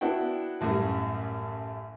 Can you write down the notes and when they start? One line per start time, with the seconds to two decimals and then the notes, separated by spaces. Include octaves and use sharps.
0.01 B3 D4 E4 F#4 G5
0.61 A1 F#2 G3 A3